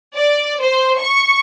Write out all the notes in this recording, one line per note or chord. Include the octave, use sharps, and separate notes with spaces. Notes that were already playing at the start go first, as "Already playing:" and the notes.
D5
C5
C#6